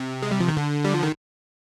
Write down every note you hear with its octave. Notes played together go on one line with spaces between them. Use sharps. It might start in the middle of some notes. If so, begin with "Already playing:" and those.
Already playing: C3
G#3
G3
F3
D#3
D3
G3
F3
D#3